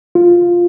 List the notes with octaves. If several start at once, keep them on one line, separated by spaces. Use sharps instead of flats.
F4